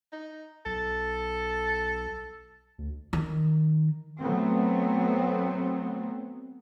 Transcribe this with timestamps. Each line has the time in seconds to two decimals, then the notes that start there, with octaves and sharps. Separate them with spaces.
0.12 D#4
0.66 B1 A4
2.78 D2
3.13 D#3
4.20 F#3 A3 B3 C4